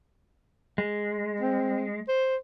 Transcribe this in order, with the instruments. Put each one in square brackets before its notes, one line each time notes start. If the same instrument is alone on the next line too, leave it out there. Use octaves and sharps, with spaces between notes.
[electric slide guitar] G#3
[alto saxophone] C4
C5